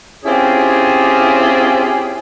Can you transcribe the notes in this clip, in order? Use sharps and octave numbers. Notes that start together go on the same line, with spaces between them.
C4 C#4 E4 F4 G4 G#4